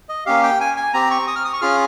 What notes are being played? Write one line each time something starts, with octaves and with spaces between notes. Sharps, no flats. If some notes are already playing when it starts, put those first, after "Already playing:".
D#5
A#3 C#4 G4 F5
G5
G#5
G#5
C4 G4 A#5
C#6
D#6
F6
D#6
C#6
C#4 F4 G#4 F6